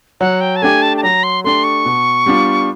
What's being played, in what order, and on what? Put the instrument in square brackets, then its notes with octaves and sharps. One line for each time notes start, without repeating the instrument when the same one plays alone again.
[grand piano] F#3 [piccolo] F#5
[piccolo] G5
A5
[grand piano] A3 D4 G4 [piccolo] G#5
[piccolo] A5
A5
[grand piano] F#3 [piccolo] A#5
[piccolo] C6
[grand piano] A3 D4 G4 [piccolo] C6
[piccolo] C#6
[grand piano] B2
G3 B3 D4 F4